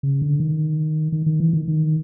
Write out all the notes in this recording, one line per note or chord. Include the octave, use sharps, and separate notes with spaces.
C#3
D3
D#3
D#3
D#3
E3
D#3
D#3